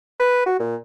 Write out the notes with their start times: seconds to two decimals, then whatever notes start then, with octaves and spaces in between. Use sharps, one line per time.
0.20 B4
0.46 F#4
0.60 A#2